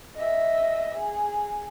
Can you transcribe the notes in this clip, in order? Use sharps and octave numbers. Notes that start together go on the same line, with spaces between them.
D#5 E5
G#4